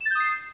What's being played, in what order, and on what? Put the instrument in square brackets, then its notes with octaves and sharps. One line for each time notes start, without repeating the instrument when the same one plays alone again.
[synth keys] E7
A6
G6
D#6
C7